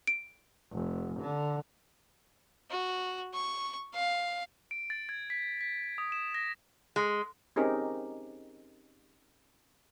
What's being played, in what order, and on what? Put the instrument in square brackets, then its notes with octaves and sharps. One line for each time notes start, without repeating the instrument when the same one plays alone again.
[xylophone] D7
[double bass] F1
D3
[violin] F#4
C#6
F5
[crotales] D7
A6
G#6
B6
B6
D#6
E7
A#6
[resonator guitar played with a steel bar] G#3
[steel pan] C4 C#4 D#4 G4 G#4 A#4